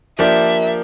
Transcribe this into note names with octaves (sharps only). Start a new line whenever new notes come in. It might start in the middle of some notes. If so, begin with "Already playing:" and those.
F3 A#3 D4 G4 D5 E5